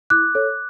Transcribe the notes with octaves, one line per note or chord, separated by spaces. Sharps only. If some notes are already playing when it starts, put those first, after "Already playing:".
E4 D6 F#6
A4 C#5